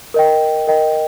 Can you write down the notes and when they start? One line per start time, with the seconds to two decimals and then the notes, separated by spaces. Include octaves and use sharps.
0.14 A#4 D#5 G5
0.68 A#4 D#5 G5